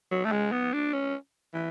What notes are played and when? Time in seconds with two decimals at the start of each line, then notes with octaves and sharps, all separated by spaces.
0.11 F#3
0.25 A3
0.32 G#3
0.52 B3
0.73 D4
0.93 C#4
1.54 E3